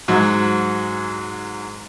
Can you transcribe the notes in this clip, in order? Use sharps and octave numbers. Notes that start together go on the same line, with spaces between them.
G#2 F#3